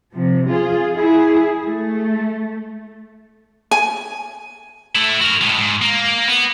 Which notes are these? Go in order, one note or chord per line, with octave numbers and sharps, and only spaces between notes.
C3 F3
F4 G#4
E4 G#4
A3
G#5
A3 E4
F#4 A#4
A2 G#3
G#2
A#3
B3